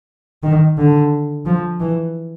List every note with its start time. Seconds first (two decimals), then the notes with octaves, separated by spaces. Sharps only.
0.43 D#3
0.78 D3
1.46 F3
1.80 E3